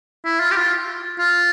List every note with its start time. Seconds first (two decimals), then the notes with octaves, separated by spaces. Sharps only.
0.25 E4
0.40 F4
0.51 G4
0.56 F4
1.19 F4